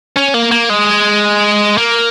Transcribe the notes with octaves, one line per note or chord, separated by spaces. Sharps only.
C#4
A#3
A#3
G#3
A#3